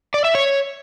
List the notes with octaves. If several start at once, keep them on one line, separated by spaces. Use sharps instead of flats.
D5
E5
C#5